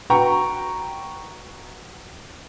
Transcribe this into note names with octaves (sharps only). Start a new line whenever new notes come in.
F#4 B4 G5 A#5 C#6